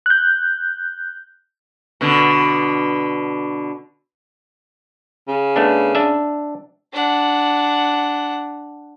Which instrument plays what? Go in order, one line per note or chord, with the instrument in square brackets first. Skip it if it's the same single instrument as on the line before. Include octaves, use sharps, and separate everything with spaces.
[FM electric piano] F#6 G6
[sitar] B2 D3
[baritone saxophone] C#3
[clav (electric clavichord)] A3 B3 D4
D4 E5
[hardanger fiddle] D4 F#5